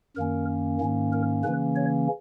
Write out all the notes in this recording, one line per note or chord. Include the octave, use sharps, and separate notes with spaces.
F#2 D#3 A#3 C#4 A#4
G#2 D#3 A#3 C#4
A#4
C#3 E3 A#3 C#4 B4
C#5